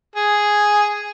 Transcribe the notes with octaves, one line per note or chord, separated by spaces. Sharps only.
G#4